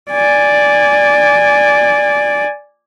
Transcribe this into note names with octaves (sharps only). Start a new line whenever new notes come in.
D5 G#5